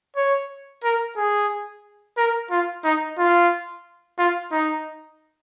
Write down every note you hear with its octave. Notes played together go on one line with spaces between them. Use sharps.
C#5
A#4
G#4
A#4
F4
D#4
F4
F4
D#4